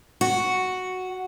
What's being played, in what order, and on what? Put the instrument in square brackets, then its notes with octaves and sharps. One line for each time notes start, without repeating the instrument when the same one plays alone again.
[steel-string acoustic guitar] F#4